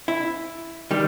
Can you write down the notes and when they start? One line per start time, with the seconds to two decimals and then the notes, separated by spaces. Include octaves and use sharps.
0.08 E4
0.91 D#3 G3